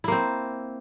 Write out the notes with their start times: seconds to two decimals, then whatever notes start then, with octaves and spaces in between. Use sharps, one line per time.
0.04 E4
0.08 A#3
0.12 C4